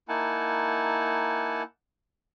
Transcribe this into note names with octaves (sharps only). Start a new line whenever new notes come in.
A#3 D#4 E4 F#5 G#5 A5